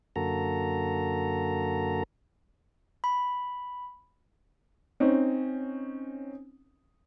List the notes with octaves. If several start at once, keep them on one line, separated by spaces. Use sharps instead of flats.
F#2 D3 A#3 F#4 A4 A#5
B5
C4 C#4 D#4